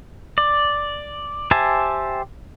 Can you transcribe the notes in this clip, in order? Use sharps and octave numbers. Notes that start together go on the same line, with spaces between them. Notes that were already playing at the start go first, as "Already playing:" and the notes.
D5
G4 C5 E5 G#5 A5